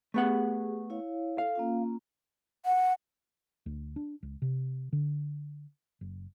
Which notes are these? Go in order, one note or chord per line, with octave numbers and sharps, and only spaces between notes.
A3 B3 G4 G#4 F#5
E4 C#5 F5
A4 F5
A#3 C#4 F4
F#5
D2
D4
C#2
C3
D3
F#1